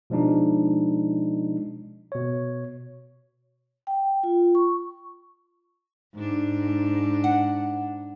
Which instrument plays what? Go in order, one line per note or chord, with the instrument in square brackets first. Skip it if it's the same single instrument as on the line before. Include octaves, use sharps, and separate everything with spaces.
[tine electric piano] B2 F3 G#3 D4 D#4
B2 C#5
[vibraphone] G5
F4
C#6
[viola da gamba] G#2 D4
[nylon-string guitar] F#5